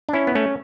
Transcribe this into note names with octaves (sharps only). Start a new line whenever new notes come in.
D4
C#4 E4
B3
A3 C#4